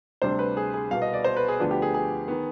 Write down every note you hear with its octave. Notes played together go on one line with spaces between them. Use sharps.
D2 C3 G3 D4 C5
B4
G#4
G#4
C2 B2 B3 F5
D#5
D5
C5
B4
G#4
D2 D3 F3 B3 D4
G4
G#4
G#4
D#3 B3